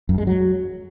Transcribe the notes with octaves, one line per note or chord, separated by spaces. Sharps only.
F#2
G#3
F#3